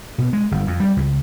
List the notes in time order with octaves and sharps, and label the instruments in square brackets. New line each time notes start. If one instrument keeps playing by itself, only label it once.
[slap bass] B2
G#3
G1
F2
G3
C#2